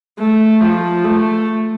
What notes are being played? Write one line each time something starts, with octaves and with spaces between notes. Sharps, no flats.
A3
F3
A3